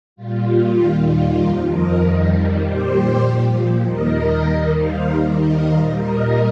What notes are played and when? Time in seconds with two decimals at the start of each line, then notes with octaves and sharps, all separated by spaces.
0.16 A#2 G3 F4
0.77 D#2 D#3 G3 F4
1.08 F4
1.38 F2 F3 F4 A#4
1.69 A#4 D#5
1.99 F2 D#3 G3
2.61 A#2 G3 G4 C5
3.22 A#2 F3
3.83 D#2 D#3 G3 A#4 D#5
4.44 D#2 D#3 G3 A#4 D#5
4.75 C5 F5
5.05 D#2 D#3 G3 A#4 D#5
5.36 A#4 D#5
5.67 A#2 G3 C5 F5
5.97 A#4 D#5